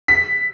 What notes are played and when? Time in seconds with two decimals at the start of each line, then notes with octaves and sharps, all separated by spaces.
0.08 B6